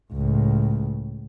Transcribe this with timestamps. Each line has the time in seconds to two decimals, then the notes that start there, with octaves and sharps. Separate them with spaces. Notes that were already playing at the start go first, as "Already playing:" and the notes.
0.13 C#2 A2